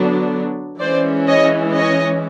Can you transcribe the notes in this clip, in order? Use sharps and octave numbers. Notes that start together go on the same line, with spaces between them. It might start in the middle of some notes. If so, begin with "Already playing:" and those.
Already playing: D3 F#3 B3 D4
E3 G#3 C#4 C5 D5
C#5 D#5
C#5 D#5